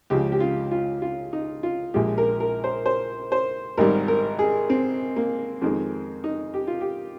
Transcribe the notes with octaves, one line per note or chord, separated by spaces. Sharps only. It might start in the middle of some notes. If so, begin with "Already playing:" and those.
C#2 C#3 F3 G4
G4
F4
F4
F4
D#4
F4
A#1 A#2 F3 G#3 G4
A#4
A#4
C5
C5
C5
G#1 G#2 G3 A#4
A#4
G#4
C4
A#3
F2 D#3 G#3 C4
D#4
G4
F4
G4